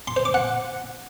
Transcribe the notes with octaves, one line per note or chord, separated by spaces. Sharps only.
C6
C5
D6
F#5